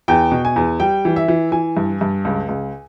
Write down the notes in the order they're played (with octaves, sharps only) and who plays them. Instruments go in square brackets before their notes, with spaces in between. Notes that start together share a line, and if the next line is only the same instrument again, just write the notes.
[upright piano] E2 G5
B2
G#5
E2
G3 G5
E3
E5
E3
E3 G#5
G2
G2
C#2
C#2